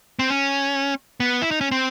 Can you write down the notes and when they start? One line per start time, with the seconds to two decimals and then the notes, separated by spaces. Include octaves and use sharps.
0.19 C4
0.30 C#4
1.20 B3
1.42 E4
1.51 D#4
1.61 C#4
1.71 C4